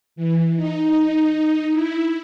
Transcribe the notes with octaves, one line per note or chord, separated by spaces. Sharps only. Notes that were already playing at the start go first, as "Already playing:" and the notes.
E3
D#4
E4